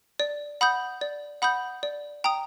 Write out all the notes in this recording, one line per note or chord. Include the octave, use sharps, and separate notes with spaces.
D5
F#5 B5 D#6 G6
D5
F#5 B5 D#6 G6
D5
G5 A#5 D#6